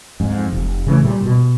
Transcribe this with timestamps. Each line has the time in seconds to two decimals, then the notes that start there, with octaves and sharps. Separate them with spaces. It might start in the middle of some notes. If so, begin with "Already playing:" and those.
0.20 F2 G#2
0.53 F1
0.87 C#3 E3 A3
1.02 A#2 G3
1.24 B2